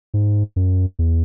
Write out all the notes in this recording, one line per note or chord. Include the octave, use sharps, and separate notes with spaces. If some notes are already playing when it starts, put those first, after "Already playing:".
G#2
F#2
E2